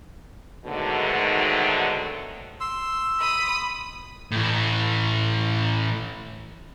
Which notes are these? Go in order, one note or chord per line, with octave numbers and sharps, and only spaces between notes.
G#2 B2 D3 D#3 F#3 A3
C6 E6
B5 D#6
A2 E3